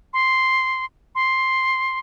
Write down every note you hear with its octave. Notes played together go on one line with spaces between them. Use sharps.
C6
C6